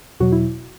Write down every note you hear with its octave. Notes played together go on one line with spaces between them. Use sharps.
E2 B2 F#3 F#4
E4